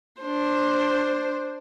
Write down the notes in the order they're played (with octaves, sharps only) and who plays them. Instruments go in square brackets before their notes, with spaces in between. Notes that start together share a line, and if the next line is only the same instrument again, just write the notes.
[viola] D4 C5